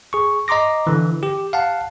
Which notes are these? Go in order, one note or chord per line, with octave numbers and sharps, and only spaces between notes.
G#4 C#6
D#5 A#5 C6 D6 A#6
D3 E3
G4
F5 F#5 A5